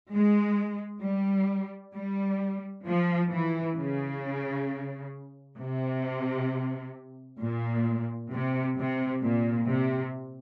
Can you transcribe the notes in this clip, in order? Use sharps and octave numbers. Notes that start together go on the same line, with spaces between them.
G#3
G3
G3
F3
E3
C#3
C3
A#2
C3
C3
A#2
C3